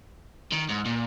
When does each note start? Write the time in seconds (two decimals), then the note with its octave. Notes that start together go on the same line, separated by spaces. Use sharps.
0.52 D#3
0.69 G#2
0.85 A#2